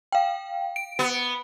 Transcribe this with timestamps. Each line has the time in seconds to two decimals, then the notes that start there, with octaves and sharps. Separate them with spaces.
0.12 F5 G5
0.76 D7
0.99 B3